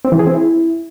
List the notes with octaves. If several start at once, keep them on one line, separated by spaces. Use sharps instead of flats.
C4
E3
G#4
C4
E4